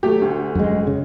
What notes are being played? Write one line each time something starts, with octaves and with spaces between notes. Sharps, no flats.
F#3 A3 G4
D2
F#2 G#3
C#3